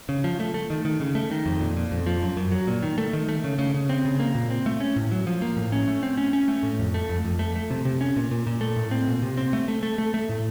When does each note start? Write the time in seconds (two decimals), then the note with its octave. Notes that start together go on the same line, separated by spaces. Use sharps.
0.09 C#3
0.24 F3
0.40 A3
0.54 A3
0.70 D#3
0.85 D#3
1.00 C#3
1.15 A3
1.31 D#3
1.46 F2
1.61 A#2
1.77 A#2
1.91 F2
2.06 F3
2.22 F#2
2.37 F#2
2.52 F#3
2.67 A#2
2.83 D#3
2.98 A3
3.13 D#3
3.29 A3
3.44 C#3
3.59 C#3
3.74 C#3
3.89 C4
4.05 C#3
4.19 A#3
4.35 A#2
4.50 C4
4.66 A3
4.80 C#4
4.96 A2
5.11 F#3
5.27 F3
5.42 A#3
5.57 A2
5.72 C#4
5.88 A3
6.03 C4
6.17 C#4
6.33 C#4
6.48 A3
6.63 A2
6.79 F2
6.94 A3
7.09 F2
7.25 F2
7.39 A3
7.55 A3
7.71 C3
7.85 C3
8.01 C#4
8.16 A#2
8.31 A#2
8.47 A#2
8.61 A3
8.76 A2
8.91 C4
9.07 A#2
9.22 C3
9.37 C4
9.53 A3
9.68 A3
9.83 A3
9.98 A3
10.14 A3
10.29 A2